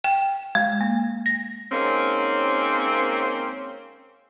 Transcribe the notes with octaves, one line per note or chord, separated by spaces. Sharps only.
G5
G#3
A#3
A#6
G#2 A#3 C4 C#4